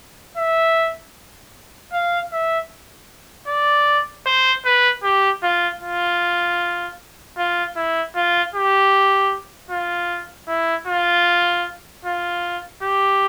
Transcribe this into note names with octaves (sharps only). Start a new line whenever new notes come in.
E5
F5
E5
D5
C5
B4
G4
F4
F4
F4
E4
F4
G4
F4
E4
F4
F4
G4